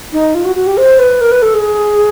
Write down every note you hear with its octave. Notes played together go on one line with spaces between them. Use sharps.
D#4
F4
F#4
F#4
G4
C5
B4
A#4
B4
A4
G#4